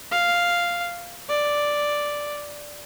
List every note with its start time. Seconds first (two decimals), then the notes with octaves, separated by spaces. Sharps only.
0.11 F5
1.29 D5